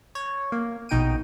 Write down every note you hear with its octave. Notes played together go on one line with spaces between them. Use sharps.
C#5
A#3
A#1 B2 D#4 G5 D7 D#7